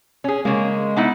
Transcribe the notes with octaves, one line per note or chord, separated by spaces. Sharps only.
C#4 G#4
C#3 G#3 A#3
B3 D#4 E4